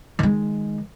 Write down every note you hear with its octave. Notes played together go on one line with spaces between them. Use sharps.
D#3 G#3